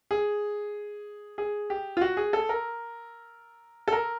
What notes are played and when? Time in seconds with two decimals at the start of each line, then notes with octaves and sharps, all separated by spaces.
0.11 G#4
1.38 G#4
1.70 G4
1.97 F4
2.01 F#4
2.17 G#4
2.33 A4
2.49 A#4
3.88 A4
3.92 A#4